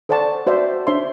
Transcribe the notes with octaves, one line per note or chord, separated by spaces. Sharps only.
A4 C5 D5 F#5 A5 C#6
F#4 C5 D5 E5
D4 C5 C#5 E5 C6